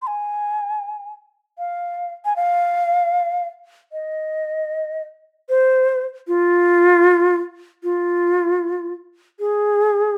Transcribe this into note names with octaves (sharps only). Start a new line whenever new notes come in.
C6
G#5
F5
G#5
F5
D#5
C5
F4
F4
G#4